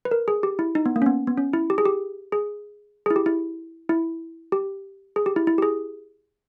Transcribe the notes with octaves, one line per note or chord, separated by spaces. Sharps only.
B4
A#4
G#4
G4
E4
D#4
B3
A#3
C#4
B3
B3
C#4
E4
G4
G#4
G4
G#4
E4 G#4
G4
E4
E4
G4
G#4
G4
E4
E4
G4
G#4